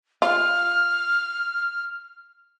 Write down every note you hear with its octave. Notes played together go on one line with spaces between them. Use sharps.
F4 F6